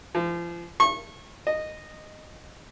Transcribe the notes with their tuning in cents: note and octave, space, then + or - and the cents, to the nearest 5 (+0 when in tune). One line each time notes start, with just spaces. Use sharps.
F3 -35
C#6 -30
D#5 -10